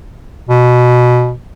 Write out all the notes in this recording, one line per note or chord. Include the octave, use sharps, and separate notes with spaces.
B2